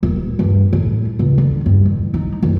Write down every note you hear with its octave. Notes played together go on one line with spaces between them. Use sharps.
D#1
G2
A2
C#2
D3
G2
A1
D#4
F#1